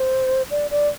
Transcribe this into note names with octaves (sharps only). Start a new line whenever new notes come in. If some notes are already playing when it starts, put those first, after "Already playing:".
Already playing: C5
D5
D5